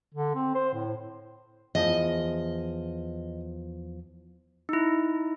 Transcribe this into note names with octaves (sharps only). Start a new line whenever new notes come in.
D3
C4
C5
A2
E2 F3 D#5
D#4 E4